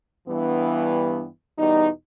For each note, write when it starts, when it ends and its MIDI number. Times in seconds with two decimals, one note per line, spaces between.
0.28 1.27 43
0.28 1.27 52
0.28 1.27 59
1.59 1.88 40
1.59 1.88 47
1.59 1.88 55
1.59 1.88 63